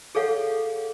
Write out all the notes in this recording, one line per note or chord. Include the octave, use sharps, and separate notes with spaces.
G#4 A4 C#5 F5 F#5